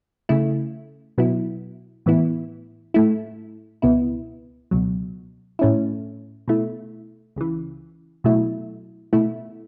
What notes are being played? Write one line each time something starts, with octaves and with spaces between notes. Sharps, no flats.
C#3 A3 E4
B2 F#3 B3 E4
A2 E3 B3 E4
A2 A3 E4
C#2 B2 B3 E4
C#2 B2 F#3
A2 A3 C#4 E4
B2 A3 E4
C#2 C#3 E3
B2 F#3 A3 E4
B2 A3 E4